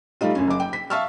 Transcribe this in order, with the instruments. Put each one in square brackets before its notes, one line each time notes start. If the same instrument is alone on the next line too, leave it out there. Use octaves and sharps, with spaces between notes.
[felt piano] G3 A3 D#4 F4
F#2 C#4
F#1 D6
G5
B6
E5 F5 A5 C#6 E6 F6